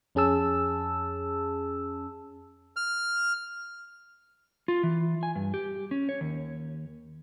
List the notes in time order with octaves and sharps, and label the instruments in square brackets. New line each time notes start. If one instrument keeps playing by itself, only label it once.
[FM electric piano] F2 C#4 G#4 A5 E6
[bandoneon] F6
[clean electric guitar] F4
E3
G#5
G2
G4
C#4
C#5
D#2